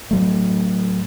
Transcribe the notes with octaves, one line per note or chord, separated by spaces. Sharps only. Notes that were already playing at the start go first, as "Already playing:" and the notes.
A2 F#3 A3